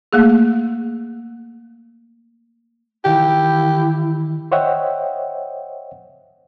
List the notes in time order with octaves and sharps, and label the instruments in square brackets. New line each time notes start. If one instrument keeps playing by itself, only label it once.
[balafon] A3 A#3 G#4
[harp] D#3 E3 [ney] E4 [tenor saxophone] G4
[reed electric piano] C5 C#5 D#5 E5 F#5 G5